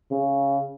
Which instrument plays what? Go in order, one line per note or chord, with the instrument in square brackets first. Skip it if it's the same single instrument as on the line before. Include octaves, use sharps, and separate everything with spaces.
[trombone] C#3